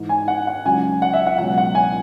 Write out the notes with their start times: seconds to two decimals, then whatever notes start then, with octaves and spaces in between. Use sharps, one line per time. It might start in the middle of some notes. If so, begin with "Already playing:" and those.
Already playing: G#2 E3
0.09 G#5
0.28 F#5
0.47 F#5
0.65 C#2 C#3 F#3 G#5
1.02 F#5
1.13 E5
1.27 F#5
1.38 C#2 B2 F#3 F#5
1.58 F#5
1.75 G#5